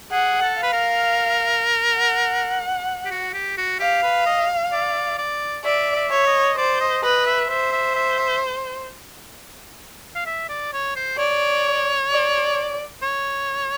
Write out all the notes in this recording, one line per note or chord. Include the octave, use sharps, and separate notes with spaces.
G#4 F#5
A4
B4 F5
A#4
F#5
G4
F#4
G4
F#4
G4 F5
B4
D#5
D5
D5
D5 E5
E5
C#5
D#5
C5 D5
D#5
B4 D#5
E5
C5 E5
E5
E5
E5
F5
E5
D5
C#5
C5
C#5 D5
D5
C#5